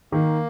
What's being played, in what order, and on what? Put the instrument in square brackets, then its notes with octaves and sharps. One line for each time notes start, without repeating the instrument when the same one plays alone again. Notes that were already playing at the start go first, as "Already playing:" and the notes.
[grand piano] D#3 [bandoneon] A#3